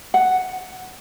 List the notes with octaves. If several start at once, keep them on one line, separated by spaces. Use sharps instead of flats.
F#5